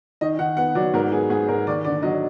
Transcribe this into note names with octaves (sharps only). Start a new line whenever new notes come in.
D#3 D#5
D#3 F#5
B3 F#5
F#3 D5
G#2 A#4
B3 G#4
G#2 G#4
G#2 A#4
D#2 D5
D3 D5
F#3 D#5